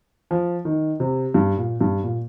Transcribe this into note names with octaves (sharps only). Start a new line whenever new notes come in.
F3
D#3
C3
G2
A#2
G2
A#2